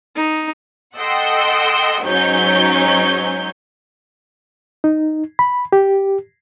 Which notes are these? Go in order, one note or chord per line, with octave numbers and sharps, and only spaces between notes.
D#4
A4 D#5 F#5 G5 C6 E6
G#2 F#3 C#4 D#4 C#5 G6
D#4
B5
G4